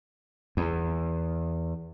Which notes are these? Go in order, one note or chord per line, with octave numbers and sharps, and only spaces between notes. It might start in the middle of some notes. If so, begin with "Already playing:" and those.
E2